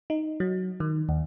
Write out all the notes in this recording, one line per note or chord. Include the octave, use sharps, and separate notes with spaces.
D#4
F#3
D#3
D#2